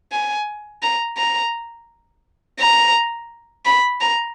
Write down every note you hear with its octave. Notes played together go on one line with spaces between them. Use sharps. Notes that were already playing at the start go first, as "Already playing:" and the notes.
G#5
A#5
A#5
A#5
B5
A#5